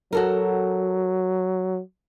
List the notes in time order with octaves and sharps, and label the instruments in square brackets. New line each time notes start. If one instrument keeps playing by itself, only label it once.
[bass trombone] F#3 [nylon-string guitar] F#4 A4 A#4